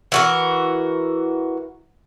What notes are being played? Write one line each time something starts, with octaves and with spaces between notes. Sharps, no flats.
E3 F#4 A#4